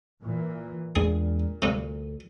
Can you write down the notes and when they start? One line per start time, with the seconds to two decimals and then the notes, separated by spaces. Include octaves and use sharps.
0.22 A#2 E3
0.96 E2 A#2 G#3 D4 G#4
1.62 D2 G2 C3